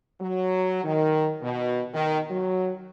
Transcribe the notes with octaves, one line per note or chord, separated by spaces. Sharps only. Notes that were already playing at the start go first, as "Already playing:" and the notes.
F#3
D#3
B2
D#3
F#3